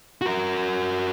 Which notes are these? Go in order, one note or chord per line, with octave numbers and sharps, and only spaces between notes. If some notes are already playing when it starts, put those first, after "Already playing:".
F#4 A#4